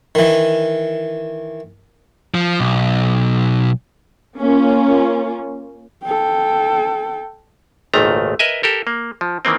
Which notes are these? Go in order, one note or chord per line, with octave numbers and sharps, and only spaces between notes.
D#3 E3
F3
B1
A#3 C#4 F4
A4 G5
G#1 C#2 A#2 D#3 A3 A#5
A#4 B4 D#5 E5 G#5
G4 A4 A#4
A#3
F3
D#3 E3 A#3 C4